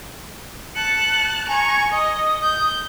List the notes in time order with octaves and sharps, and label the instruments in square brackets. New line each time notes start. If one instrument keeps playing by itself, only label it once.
[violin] A5 F#6 [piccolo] C#7
[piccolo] G#5 [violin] A#5 C#6
[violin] D#5 [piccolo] D#6
[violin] G6